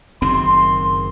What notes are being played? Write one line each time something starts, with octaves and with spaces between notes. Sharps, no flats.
F#1 D#3 C4 C6